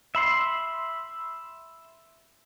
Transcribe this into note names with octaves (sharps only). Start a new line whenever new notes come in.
E5 B5 C6